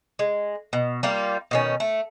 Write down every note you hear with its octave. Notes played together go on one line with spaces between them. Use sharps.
G#3
B2
G3 A#3 F4
B2 D#3 C#4
A3